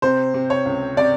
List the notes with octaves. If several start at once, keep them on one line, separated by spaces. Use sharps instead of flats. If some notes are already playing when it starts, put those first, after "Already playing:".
C3 C5
C3
C#5
C#2
C3 D5